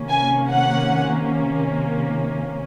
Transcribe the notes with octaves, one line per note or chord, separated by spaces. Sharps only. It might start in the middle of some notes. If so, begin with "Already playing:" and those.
Already playing: C3 D#3 A#3 C#4
G#5
F#5